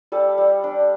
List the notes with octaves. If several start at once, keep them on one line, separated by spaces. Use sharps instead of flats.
G3 A4
G3
D4